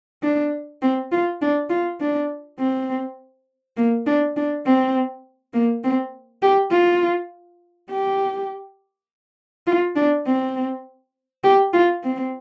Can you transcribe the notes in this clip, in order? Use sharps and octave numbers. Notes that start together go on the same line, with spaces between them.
D4
C4
F4
D4
F4
D4
C4
A#3
D4
D4
C4
A#3
C4
G4
F4
G4
F4
D4
C4
G4
F4
C4